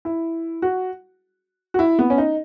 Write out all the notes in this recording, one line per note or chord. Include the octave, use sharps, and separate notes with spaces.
E4
F#4
F#4
E4
B3
C#4
D#4